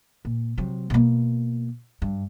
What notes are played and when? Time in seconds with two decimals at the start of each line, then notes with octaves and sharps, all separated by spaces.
0.25 A#2
0.58 C3 F#3
0.90 B2 A#3
2.02 G2